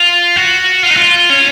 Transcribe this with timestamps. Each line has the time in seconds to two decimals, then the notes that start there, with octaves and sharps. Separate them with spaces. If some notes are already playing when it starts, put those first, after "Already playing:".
Already playing: F4
0.36 F#4
0.83 F4
0.90 D#4
0.97 F4
1.30 C#4